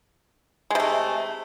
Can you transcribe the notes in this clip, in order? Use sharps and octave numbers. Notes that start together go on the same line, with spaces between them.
C3 G#3 A3